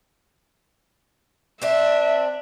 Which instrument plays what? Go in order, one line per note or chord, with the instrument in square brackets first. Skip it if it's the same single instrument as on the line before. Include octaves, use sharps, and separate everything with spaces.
[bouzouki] C4 D4 [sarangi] E5